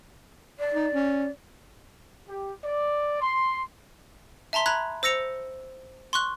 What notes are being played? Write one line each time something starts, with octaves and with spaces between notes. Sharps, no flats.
D5
D#4
C#4
G4
D5
C6
E5 A5 A#5 C6 B6
A#5 B5 F#6 G#6
C5 E6 A#6 C#7 F7
C6 C#6 F#6